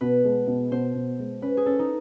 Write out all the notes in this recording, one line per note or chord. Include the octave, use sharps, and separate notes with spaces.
B2 B4
G#3
B2
B2 C5
B2
G#3
C#4 B4
G#4
C#4 A4
D#4